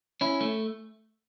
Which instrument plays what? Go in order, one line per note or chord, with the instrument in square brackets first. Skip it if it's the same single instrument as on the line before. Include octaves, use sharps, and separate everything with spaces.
[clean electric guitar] C#4 E4
A3